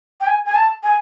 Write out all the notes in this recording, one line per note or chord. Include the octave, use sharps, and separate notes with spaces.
G5
G#5
G#5
A5
G#5